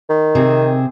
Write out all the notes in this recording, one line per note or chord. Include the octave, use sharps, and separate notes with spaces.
D#3
C3 C4 G#4